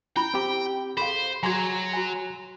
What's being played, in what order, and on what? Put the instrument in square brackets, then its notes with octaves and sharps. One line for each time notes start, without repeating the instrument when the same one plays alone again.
[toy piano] C#4 E4 B5 [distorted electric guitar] G5
[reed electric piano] C4 G4
[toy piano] G#4 A4 F5 [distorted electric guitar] C5 [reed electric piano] B5
[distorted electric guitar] F#3 [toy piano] F#4 G#4 G#5 [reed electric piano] A#5 C6 G#6
[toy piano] F#4 G#5